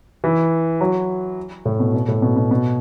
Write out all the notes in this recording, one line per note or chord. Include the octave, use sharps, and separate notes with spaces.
E3
F#3
A2
B2
B2
A2
B2
B2
B2